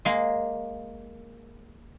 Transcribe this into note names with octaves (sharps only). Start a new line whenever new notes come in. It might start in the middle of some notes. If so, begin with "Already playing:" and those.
G#3 A#3